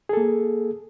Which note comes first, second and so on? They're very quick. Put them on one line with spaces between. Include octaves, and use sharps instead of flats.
G#4 A4 A#3